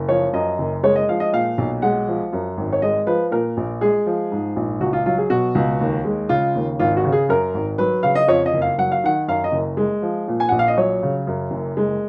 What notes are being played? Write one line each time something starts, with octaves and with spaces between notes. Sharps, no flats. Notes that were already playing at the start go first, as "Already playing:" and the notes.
Already playing: F#1
F3 C#5
F#2 D#5
F#1
G#3 C#5
D#5
F3 F5
D#5
A#2 F5
B1
G#3 F#5
F3
F#2
G#1
C#5
G#3 D#5
F3 B4
A#2 A#4
A#1
G#3 G#4
F3
G#2
A#1
C#2 F#4
F4
F#3 F4
G#4
B2 F#4
C#2
D#2
G#3
C#3 F4
D#2
G#1 F4
F#4
C#3
G#4
F#2 A#4
G#1
F#3 B4
C#3 F5
D#5
F2 C#5
D#5
F#1
F5
F#3 F#5
F5
D#3 F#5
F#2 F5
D#5
F#1
G#3
F3
A#2
G#5
A#1 F#5
F5
D#5
F#3 C#5
C#3
F#2
F#1
G#3